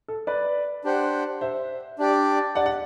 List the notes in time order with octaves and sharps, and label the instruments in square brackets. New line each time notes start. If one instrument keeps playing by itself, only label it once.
[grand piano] A4
B4 D5
[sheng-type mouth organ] D4 G4 C5 F#5
[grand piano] C5 E5
[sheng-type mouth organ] D4 G4 D5
[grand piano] D5 F#5
F#5